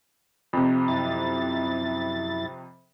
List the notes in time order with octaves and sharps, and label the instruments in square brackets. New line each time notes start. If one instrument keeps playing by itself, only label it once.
[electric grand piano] F2 C3
[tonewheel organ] F#2 E4 A6